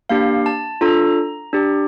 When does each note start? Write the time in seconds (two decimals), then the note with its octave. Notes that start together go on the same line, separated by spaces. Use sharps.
0.09 A#3 D4 G4 F5
0.46 A5
0.81 D4 F4 A4 A#5
1.53 D4 G4